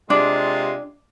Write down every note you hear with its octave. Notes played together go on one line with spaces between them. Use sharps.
C3 G#3 D4 F4